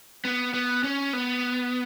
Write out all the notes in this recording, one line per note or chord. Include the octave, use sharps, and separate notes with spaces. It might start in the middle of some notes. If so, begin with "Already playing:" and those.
B3
B3
C#4
B3